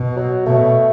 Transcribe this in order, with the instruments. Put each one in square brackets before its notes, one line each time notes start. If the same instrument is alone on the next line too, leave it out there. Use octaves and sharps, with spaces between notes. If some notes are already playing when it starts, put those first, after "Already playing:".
Already playing: [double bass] B2
[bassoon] F#3
[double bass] B2 [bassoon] A3